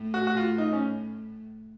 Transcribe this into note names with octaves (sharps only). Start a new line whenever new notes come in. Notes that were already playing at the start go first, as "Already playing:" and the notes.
Already playing: A2
F#4
F#4
F4
D#4
C#4